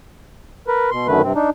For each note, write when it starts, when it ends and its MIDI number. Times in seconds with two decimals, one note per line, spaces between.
0.67 0.90 70
0.67 0.90 71
0.91 1.07 47
0.91 1.07 84
1.08 1.22 42
1.08 1.22 50
1.08 1.22 51
1.08 1.22 57
1.08 1.22 71
1.23 1.33 43
1.23 1.33 48
1.23 1.33 60
1.35 1.50 62
1.35 1.50 63